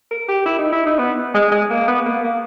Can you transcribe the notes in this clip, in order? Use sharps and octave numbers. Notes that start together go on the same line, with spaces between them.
A#4
G4
E4
D#4
E4
D#4
B3
G#3
G#3
A#3
B3
A#3
A#3